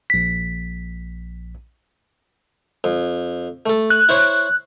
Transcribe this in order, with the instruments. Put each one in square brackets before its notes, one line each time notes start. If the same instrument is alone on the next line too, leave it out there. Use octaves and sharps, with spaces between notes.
[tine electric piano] A#1 B6
[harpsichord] F2
A3 A4
[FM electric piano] F#6
[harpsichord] E4 C5 C#5